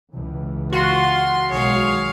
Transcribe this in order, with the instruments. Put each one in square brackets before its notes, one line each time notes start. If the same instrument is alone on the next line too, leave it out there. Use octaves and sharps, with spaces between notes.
[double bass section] C#2 E3
[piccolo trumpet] F4 [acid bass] F#4 [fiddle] C6
[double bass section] B1 D#3 G#3 [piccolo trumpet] G#4 [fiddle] C#5 F5